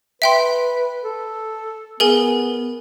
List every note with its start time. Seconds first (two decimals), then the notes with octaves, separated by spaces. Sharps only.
0.22 B4 E5 G5 C6
1.04 A4
2.00 B3 G#4 A#4 G#5